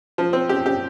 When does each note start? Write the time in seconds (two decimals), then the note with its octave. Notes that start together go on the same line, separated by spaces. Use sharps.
0.18 F3
0.33 C4
0.49 G4
0.66 G4